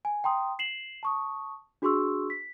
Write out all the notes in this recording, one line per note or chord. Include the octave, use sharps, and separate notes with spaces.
G#5
G5 A#5 C6 D#6
C7 E7 F#7
A5 C#6 D#6
D4 F#4 G#4 C6 C#6 E6
B6